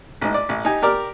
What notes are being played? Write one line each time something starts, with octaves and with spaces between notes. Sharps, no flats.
A1 G#2
D5
A1
D#4 G4 G#5
G4 A#4 D5 A#5 D6 F6